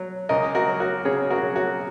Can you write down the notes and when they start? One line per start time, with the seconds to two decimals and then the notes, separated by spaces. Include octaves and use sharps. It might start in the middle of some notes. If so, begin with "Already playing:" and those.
Already playing: F#3
0.29 C#2 A#4 D#5
0.55 F#4 A#4
0.68 F#3
0.80 F#4 A#4
1.05 C#3 G#4 C#5
1.30 F#4 A#4
1.43 F#3
1.55 F#4 A#4